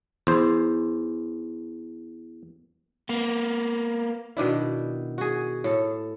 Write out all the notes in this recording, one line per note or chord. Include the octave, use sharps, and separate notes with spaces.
E2 C5
A#3 B3
B2 D#3 D4 E4
F#4 G#4
A2 A4